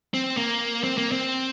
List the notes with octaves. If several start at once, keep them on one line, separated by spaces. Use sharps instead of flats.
C4
A#3
C4
A#3
C4